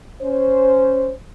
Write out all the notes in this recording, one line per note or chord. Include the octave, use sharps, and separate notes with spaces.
C#4 C5